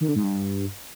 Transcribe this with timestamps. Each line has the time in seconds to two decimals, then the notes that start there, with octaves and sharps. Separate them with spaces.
0.01 D#3
0.08 D3
0.16 G#2
0.23 G2